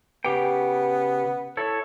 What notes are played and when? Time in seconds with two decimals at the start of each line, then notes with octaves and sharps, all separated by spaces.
0.25 C#3 B3 G4 G5
1.57 E4 A4 C#5